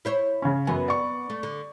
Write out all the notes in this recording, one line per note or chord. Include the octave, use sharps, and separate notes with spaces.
E4 C5 C#5
C#3 C#4
F#2 B3 G#5
D5 C#6
A3
D3